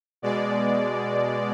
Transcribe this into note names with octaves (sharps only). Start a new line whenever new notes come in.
B2 G#3 D5